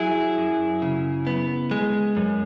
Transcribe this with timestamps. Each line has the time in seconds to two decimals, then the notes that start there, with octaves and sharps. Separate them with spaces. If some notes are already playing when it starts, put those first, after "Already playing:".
Already playing: F#3 E4 G#4
0.37 F#2
0.82 C#3
1.27 B3
1.71 G#3
2.17 F#2